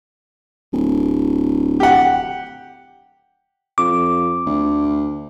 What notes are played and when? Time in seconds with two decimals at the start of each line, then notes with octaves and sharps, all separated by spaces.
0.73 D1
1.80 G4 F#5
3.78 F2 D6
4.46 D2